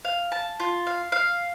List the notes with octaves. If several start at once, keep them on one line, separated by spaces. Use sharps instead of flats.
F5
A5
F4
F5
F5